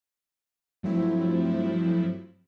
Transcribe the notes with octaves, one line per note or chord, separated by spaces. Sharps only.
G2 F3 F#3 A3 C4 E4